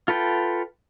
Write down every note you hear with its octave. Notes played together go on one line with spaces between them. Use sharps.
F4 A4 B4 G5